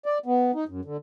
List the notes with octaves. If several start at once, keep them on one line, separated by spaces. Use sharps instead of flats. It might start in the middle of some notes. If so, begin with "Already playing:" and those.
D5
B3
D#4
F#2
D3